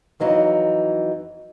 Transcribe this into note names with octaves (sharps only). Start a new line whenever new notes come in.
F2 E3 F#3 D#4